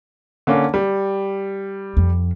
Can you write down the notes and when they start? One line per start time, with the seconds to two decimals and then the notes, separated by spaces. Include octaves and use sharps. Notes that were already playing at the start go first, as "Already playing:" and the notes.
0.47 D3 A#3 C#4
0.74 G3
1.97 F2